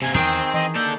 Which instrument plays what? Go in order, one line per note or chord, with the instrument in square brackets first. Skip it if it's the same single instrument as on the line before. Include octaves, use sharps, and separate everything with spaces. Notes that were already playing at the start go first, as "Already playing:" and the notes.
[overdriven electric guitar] C3 A#3 [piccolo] G#5
[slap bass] E2 [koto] D#3 G#4 G5 [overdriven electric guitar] C4 [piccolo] D#6
[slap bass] E3 [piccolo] D#5
[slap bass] A#3 [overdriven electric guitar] A4 D5 [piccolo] G6